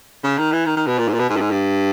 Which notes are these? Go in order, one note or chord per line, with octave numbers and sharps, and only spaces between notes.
C#3
D#3
E3
D#3
D#3
B2
A#2
G#2
A#2
B2
G#2
G2
G#2
G2